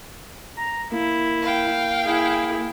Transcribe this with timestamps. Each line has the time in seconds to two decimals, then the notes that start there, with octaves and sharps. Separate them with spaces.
0.57 A#5
0.92 A#3 E4
1.42 F5 G5
2.03 E4 G#4